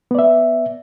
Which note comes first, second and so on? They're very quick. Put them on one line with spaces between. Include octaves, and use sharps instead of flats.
B3 D5 E5